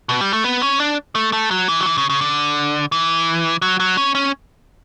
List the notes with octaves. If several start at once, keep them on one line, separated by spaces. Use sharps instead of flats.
B2
G3
A3
B3
C#4
D4
A3
A3
F#3
E3
F#3
E3
C#3
C#3
D3
E3
F#3
F#3
C#4
C#4